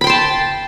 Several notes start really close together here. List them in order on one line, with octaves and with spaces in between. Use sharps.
B5 G5 C6 A5